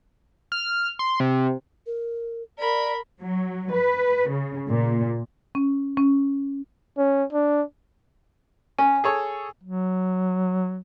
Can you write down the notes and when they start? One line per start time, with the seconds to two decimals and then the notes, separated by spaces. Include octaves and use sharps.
0.52 F6
0.99 C6
1.20 C3
1.86 A#4
2.58 A#4 D5 B5
3.21 F#3
3.72 B4
4.29 C#3
4.69 A#2
5.55 C#4
5.97 C#4
6.98 C#4
7.33 D4
8.79 C#4 G#5
9.04 G#4 A4 C#5
9.63 F#3